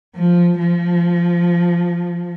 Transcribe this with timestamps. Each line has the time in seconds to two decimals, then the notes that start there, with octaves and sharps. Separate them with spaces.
0.15 F3
0.59 F3